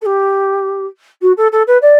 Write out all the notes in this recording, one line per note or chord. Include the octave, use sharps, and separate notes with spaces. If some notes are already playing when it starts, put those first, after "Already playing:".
A4
G4
F#4
A4
A4
B4
D5